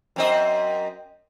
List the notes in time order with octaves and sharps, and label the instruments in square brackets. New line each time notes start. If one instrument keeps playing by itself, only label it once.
[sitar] F#2 C4 D#5